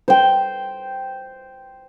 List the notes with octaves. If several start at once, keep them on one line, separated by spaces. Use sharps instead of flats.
C5 G5